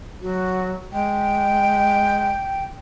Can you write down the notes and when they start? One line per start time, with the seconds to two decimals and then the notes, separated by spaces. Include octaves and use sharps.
0.21 F#3 F#4
0.93 G#3 G5